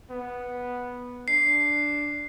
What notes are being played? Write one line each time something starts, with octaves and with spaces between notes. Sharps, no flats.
B3
D4 C7